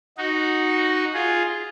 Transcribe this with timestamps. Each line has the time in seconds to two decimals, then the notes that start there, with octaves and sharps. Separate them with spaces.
0.17 D#4 F#4
1.14 F4 G#4